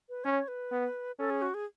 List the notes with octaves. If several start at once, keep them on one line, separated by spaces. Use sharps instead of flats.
B4
C#4 C#5
B4
B3
C#4 A4
G#4
F#4
G#4